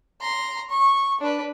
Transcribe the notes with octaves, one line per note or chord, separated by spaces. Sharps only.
A#5 C6
C#6
D4 B4